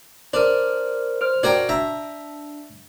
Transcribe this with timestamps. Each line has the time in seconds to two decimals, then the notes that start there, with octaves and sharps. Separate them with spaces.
0.34 D4 A#4 C5
1.21 C5 F6
1.43 D4 F#4 A#4 G5
1.69 D4 E5 A#5